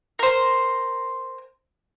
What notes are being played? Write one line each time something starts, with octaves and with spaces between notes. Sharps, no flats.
A#4 C5